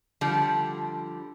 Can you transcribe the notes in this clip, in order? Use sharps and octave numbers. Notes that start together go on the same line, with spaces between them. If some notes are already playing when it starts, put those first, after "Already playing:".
D3 F3 G3 D5